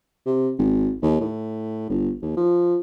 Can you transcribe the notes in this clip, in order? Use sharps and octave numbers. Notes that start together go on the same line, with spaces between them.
C3
G#1
D#2
A2
G1
D#2
F3